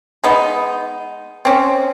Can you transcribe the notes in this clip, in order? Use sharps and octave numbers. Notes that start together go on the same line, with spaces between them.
G#3 B3 D#4
C4 C#4